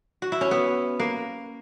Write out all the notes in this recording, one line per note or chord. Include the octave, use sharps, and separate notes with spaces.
F#4
E4
C#4
B3
A#3